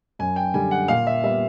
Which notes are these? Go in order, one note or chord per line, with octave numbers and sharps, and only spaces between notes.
F#2 G#5
G5
D3 G3 G#5
F#5
A#2 F5
E5
G3 B3 E5